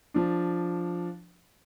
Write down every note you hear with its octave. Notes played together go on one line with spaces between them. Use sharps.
F3 D4